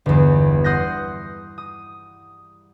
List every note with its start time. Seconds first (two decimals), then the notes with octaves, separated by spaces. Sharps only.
0.06 G1 E2
0.64 F#5 C6 D#6 F#6 G6 A#6
1.58 D#6